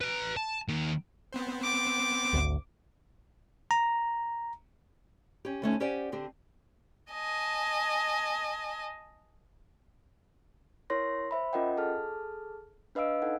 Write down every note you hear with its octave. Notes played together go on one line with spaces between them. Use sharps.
B4 A#5
A5
D#3 A#3
B3 C4 C5
D6
G#1 D2
A#5
C#4 G4
D2 A3 C#4 D#4
C#4 G4 C5 D5 F#5 G#5
D3 C4 G4
D#5 G#5 A5
E4 A#4 C#5 C6 A#6
C5 E5 B5
C#4 F4 A#4 D#5 F#5 G5
G#4 A4 A5 F6
D4 B4 D#5 F5 E6 D7
D#4 A4 F#5